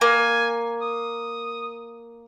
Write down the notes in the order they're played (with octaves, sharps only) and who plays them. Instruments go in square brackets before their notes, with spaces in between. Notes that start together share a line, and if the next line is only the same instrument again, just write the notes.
[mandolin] A#3 [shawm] G#5
[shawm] D#6